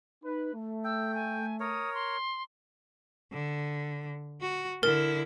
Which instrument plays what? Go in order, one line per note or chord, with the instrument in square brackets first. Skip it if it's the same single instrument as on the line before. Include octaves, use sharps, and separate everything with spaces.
[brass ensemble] D#4 B4
A3
[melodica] G5 [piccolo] E6
[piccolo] G#5
[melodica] A#4 C#5 [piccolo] D#6
[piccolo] C6
[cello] D3
F#4
[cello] D3 E4 [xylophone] A#4